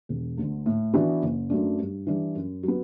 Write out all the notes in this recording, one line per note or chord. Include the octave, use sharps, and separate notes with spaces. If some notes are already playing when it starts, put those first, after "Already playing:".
E1
D2 D3
A2
E3 B3 D4 F#4
F#1
F#2 F#3 A3 D4
G2
E3 G3 D4
F#2
F#3 B3